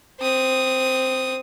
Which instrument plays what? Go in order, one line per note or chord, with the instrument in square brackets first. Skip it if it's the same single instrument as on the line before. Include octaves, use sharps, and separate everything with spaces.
[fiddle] C4 D#6